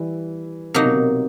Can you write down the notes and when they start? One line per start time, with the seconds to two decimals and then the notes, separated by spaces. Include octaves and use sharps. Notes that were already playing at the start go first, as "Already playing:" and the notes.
Already playing: E3 G3
0.74 C3 F#3 A#3 D#4
0.84 B2
0.94 C3